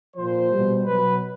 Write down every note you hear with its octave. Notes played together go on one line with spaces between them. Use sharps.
A#2 F3 C5
B2 G3
B2 F#3 B4